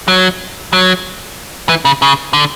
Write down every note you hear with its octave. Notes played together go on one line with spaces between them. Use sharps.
F#3
F#3
E3
C#3
C#3
D3